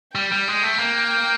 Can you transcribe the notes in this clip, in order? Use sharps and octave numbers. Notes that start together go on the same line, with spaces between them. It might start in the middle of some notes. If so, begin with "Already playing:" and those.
G3 G5
G3
G#3
A3
A#3